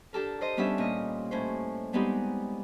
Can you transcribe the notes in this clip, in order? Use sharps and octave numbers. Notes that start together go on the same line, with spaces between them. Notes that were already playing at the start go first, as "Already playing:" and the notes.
D4 G4 A4 A#4
G4 C5 D#5
G3 B3 C#4 D4 G4 E5
A#2 D#5
A2 C#4 C5
G3 G#3 B3 C4 D#4 G4